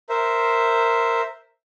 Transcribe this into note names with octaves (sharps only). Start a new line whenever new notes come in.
A#4 C5 E5